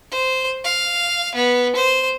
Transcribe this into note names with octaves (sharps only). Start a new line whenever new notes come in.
C5
F5
B3
C5